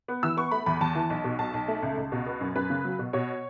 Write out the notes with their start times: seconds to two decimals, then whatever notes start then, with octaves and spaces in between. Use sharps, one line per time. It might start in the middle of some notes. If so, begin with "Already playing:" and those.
0.08 B3
0.23 E3 E6
0.37 B3 C#6
0.51 A3 B5
0.66 E2 B5
0.81 E2 A5
0.95 E3
1.10 B1
1.24 B2
1.39 B1 A5
1.54 B1
1.68 A3
1.83 C#2
1.97 C#2
2.12 B2
2.26 B3
2.41 F#2
2.56 F#2 B4
2.70 C#3
2.85 F#3
2.99 B2
3.13 B2 C#5